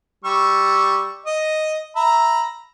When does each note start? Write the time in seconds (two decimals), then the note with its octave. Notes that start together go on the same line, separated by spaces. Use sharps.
0.24 G3 C#6 E6
1.26 D#5
1.96 E5 A#5 B5